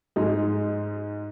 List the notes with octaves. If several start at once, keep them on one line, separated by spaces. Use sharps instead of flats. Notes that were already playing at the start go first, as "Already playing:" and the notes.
G#2 G#3 D#4